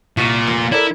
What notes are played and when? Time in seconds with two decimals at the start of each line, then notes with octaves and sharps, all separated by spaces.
0.17 C2 A#2 C#6 B6
0.47 F1
0.72 E4 A4 A#4 D5